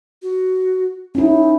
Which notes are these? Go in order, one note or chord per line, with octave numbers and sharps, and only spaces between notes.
F#4
C#4 D#4 E4